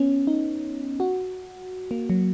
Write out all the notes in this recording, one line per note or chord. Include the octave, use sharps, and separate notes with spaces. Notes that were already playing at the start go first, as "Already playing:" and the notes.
Already playing: B3 C#4
D#4
F#4
A#3
F#3